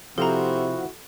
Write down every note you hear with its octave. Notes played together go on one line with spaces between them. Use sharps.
C3 F3 C4 E4 F#4 A4 C5 A#5